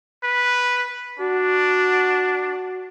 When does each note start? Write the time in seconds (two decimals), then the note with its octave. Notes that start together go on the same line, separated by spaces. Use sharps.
0.23 B4
1.19 D4 F#4